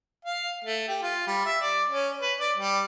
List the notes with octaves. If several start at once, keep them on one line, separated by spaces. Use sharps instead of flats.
F5
A3
G4
F4
G3
E5
D5
C#4
B4
D5
G3